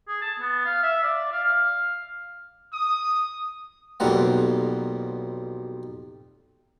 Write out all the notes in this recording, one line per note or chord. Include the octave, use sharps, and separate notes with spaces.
G#4
A5
B3
F5
E5
D5
F5
F5
D#6
B1 F2 G3 A#3 F#5